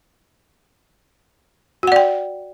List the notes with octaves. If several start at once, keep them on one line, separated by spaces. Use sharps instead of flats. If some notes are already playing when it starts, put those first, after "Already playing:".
F#4 D5 F#5 G5